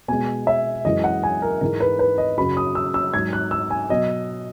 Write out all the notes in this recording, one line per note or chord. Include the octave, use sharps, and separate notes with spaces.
B2 G#3 G#5
E5
F#2 E3 G#3 D#5
F#5
G#5
A#4
G#2 E3 G#3 A#4
B4
B4
D#5
F#2 C#3 F#3 B5
D#6
E6
E6
G#2 F#3 G#6
F#6
E6
G#5
B2 F#3 D#5